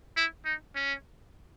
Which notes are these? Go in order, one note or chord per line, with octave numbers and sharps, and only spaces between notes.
E4
D#4
C#4